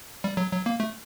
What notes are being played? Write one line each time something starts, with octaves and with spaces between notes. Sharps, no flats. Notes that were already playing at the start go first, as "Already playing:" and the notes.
G3
F#3
F#3
A#3
A3